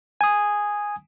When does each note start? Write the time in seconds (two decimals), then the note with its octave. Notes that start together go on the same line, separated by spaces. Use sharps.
0.21 G#5 D#6